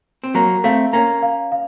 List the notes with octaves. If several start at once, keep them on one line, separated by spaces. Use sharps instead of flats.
C4
F#3 A#3 A#5
A3 C4 F5
A#3 C#4 A#5
F5
F5